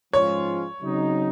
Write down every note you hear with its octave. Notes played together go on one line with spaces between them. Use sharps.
G#2 F3 G#3 C#4 F4 C#5
C#3 F#3 C4 D#4